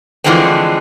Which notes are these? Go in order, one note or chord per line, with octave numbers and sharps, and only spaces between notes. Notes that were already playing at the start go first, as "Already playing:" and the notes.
D3 E3 F3 G#3 A3 C4